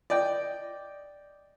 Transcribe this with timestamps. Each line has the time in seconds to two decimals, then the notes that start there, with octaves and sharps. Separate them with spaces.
0.10 D5 D#5 G5